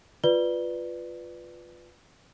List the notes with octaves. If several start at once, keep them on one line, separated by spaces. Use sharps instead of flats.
F4 B4 D5 G7